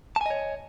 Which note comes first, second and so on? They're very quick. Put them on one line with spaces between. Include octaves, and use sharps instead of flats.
A5 G#5 D#5 C#5